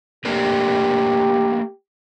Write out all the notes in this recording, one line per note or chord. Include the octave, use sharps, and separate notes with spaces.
A3 A#3 D4 G4